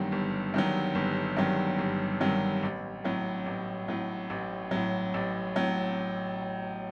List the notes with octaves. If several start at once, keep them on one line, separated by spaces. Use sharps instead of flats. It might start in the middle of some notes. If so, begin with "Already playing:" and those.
Already playing: G1 G2 D#3 F#3
G1
G2 D#3 F#3
G1
G2 D#3 F#3
G1
G2 D#3 F#3
A1
A2 F#3
A1
A2 F#3
A1
A2 F#3
A1
A2 F#3